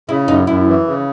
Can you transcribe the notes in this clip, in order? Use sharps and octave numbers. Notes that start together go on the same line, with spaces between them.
C#3 E4
F#2 D#4
F#2 E4
E3
C#3